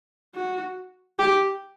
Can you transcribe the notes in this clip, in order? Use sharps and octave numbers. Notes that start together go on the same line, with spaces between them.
F#4
G4